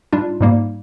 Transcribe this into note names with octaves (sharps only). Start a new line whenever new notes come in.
G#2 G3 D4 F4
G#2 G3 A#3